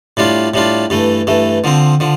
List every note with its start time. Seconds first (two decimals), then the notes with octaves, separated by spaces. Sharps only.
0.17 A2 G3 D4 F4
0.54 A2 G3 D4 F4
0.90 G2 E3 A3
1.27 G2 E3 A3
1.64 D3 F3 C4
2.00 D3 F3